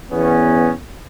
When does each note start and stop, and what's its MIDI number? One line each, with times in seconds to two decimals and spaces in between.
0.11 0.71 40
0.11 0.71 59
0.11 0.71 61